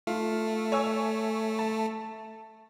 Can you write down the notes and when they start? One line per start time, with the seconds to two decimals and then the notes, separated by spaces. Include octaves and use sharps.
0.07 A3 F4
0.72 C#5 G#5 E6
1.59 A5